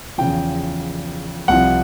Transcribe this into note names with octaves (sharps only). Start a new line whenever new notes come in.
E2 C#3 F3 G5
C2 C3 F3 F#5